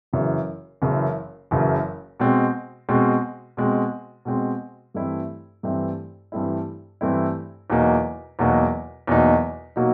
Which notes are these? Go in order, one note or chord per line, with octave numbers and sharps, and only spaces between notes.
F#1 F#2 C#3 E3
F#1 F#2 C#3 E3
F#1 F#2 C#3 E3
B2 G#3 C4
B2 G#3 C4
B2 G#3 C4
B2 G#3 C4
G2 E3 A3 C4 E4
G2 E3 A3 C4 E4
G2 E3 A3 C4 E4
G2 E3 A3 C4 E4
E2 B2 F#3 A#3 D#4
E2 B2 F#3 A#3 D#4
E2 B2 F#3 A#3 D#4
B2 F#3 A#3 D#4